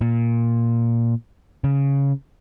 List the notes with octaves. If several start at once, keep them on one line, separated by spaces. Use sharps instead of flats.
A#2
C#3